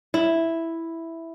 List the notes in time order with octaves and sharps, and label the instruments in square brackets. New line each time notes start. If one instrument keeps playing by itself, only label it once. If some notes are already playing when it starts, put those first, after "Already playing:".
[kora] E4